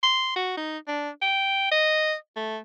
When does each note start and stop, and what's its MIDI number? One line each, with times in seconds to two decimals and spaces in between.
0.03 0.31 84
0.36 0.55 66
0.57 0.78 63
0.88 1.10 62
1.22 1.67 79
1.71 2.15 75
2.36 2.58 57